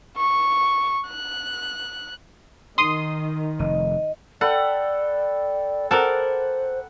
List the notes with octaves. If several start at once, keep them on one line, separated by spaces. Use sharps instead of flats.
C#6
F#6
D#3 C6 D#6
F1 D#5
A4 B4 D5 F#5 G5
A4 A#4 C5 D5 F#5